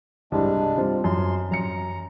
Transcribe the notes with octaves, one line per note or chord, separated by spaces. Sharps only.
C2 G2 G#3 D4
G3 C4 F4
F#2 C6
F#2 A#5 C#7